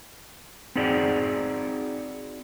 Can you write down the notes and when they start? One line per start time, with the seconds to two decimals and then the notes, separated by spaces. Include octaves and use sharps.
0.76 C4 D#4 F#4 G#4 D5